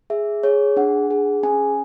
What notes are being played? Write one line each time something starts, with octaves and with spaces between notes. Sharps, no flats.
G#4 E5
G#4 C#5
D4 F#5
G#4
C#4 G#5